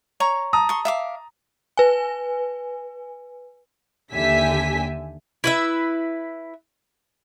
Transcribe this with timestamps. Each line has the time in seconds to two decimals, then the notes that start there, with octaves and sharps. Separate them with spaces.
0.20 C#5 A#5 C#6
0.53 A5 A#5 D#6
0.69 C6 C#6
0.85 E5 F5 D6
1.77 B4 G#5
4.13 D#2 D3 G4 E5 G#5 B6
5.44 E4 B4 E5